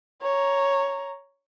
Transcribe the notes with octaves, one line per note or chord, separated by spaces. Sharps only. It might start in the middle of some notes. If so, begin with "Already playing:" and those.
C#5 A#5